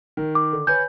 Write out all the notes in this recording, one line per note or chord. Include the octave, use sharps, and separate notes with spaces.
D#3
D6
D3
B4 C#5 G#5 G6